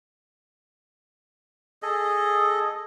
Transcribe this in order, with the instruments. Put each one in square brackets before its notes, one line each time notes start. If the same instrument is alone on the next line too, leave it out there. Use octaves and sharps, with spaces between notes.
[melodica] G#4 A4 D#5